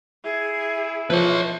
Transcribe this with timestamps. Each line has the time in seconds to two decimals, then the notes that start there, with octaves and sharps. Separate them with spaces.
0.25 E4 G#4
1.10 F3 B4 C#5